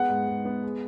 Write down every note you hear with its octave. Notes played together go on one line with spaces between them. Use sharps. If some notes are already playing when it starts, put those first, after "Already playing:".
Already playing: G#3 B3 F#5
G#2
G#2
B3
G#3